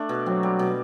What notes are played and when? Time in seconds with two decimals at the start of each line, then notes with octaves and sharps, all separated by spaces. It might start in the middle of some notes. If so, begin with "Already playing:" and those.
Already playing: A3 D4
0.09 B2
0.26 F#3 C4
0.43 G3
0.59 B2